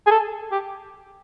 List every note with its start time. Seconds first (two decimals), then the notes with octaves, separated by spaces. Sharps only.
0.07 G#4
0.11 A4
0.52 G4